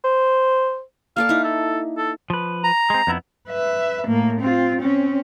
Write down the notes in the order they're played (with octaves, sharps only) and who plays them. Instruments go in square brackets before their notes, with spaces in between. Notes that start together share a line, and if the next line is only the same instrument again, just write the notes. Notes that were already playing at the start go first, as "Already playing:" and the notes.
[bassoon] C5
[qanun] A#3 A4 D5 [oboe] F5
[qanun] D#4 E4
[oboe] A4
A4
[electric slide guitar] F3 B4
[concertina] A#5
[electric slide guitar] G#3 C4
F2 B3 E4
[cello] B4 E5
A2 A#3
C4 F4
C4 C#4